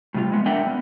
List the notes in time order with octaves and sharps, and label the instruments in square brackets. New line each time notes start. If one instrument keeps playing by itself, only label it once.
[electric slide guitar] A2 C3 G3 D#4 F4
G#3 B3
D4 A#4 E5 F#5 G5
B3